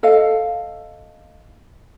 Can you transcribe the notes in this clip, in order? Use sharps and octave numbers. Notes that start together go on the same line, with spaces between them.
A4 D#5 F5